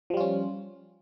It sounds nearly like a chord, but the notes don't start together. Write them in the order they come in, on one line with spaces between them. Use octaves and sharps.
F3 G3 F4 C#4